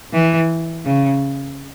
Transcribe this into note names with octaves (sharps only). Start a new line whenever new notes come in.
E3
C#3